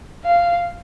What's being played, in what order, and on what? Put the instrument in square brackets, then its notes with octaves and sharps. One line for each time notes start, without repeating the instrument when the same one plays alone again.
[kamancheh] F5